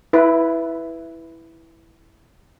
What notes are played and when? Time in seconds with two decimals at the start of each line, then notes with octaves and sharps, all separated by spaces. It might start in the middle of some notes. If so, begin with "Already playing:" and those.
0.13 E4 B4